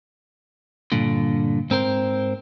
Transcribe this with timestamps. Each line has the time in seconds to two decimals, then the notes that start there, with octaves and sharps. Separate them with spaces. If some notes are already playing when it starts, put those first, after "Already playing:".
0.92 G2 A#2 D3
1.70 G#2 C4 A#4 C5